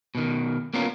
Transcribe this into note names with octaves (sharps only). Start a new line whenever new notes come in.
B2 D#3
A#3 B3 C#4 F4 A#4